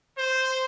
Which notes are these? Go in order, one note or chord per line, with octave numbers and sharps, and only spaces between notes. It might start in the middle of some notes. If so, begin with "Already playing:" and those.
C5